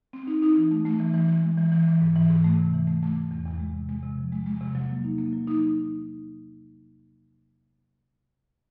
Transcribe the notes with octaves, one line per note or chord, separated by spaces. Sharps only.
C4
D#4
D#4
E3
A3
A3
E3
E3
E3
G#3
E3
E3
E3
G#2
E3
G#2
A3
C3
E3
A3
A3
A3
E2
E2
G#3
C3
G#3
C3
F3
G#3
G#3
C3
F#3
A#3
D#4
A#3
F#3
D#4